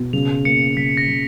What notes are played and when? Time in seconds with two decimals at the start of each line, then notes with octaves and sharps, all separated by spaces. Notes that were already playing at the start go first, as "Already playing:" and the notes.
Already playing: B2
0.13 C#3 F7
0.45 A#3 C#7
0.76 C#3 B6
0.97 A#6
1.08 C#3